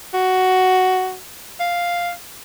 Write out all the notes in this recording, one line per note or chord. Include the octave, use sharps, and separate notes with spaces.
F#4
F5